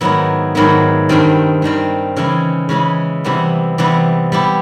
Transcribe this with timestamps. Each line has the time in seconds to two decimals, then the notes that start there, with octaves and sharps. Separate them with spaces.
0.01 G#2 D#3 F#3 B3 E4
0.55 G#2 D#3 F#3 B3 E4
1.09 G2 D#3 G3 C4
1.62 G2 D#3 G3 C4
2.17 C#3 E3 G#3 C#4 E4
2.69 C#3 E3 G#3 C#4 E4
3.24 C3 E3 G3 B3
3.78 C3 E3 G3 B3
4.32 G3 B3 E4 G4